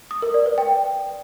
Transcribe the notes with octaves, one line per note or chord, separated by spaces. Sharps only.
D#6
A#4
D5
B4
G5